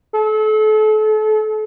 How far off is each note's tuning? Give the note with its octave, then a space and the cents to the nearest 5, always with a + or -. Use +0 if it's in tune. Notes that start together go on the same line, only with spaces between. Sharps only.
A4 -35